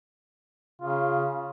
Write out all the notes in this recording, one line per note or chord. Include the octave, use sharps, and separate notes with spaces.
C#3 F4